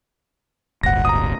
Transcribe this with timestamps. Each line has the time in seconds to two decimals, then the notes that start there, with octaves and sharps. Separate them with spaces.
0.83 D1 G1 F#5 A#6
1.05 A#5 D#6